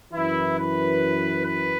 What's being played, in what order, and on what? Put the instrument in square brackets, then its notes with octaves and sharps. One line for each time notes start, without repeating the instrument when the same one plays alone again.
[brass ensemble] F#2 E3 E4
B4
B4